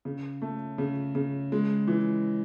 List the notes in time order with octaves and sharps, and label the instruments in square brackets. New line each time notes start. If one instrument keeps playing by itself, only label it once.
[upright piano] C#3
A3
C#3
C#3
G#3
E3